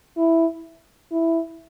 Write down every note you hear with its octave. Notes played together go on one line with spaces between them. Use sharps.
E4
E4